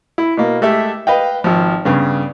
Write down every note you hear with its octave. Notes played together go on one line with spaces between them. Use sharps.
E4
B2 A#3
G#3 A3 G4 A4 E5
B4 D#5 F5 G5
G#1 F3
G2 C#3 B3